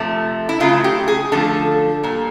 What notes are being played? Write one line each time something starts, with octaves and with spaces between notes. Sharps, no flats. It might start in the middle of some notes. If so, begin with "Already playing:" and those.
Already playing: C3 F3 A3
E4
C#3 F#3 A3 F4
G4
G#4
D3 F3 A3 A4
A#2 G3